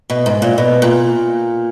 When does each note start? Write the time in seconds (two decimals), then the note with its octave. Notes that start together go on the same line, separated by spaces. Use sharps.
0.10 B2
0.26 G#2
0.42 A#2
0.58 B2
0.82 A#2